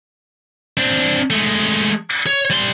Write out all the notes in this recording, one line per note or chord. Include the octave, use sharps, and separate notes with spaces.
C4 D4
G#3 A3
C#5
G3 C6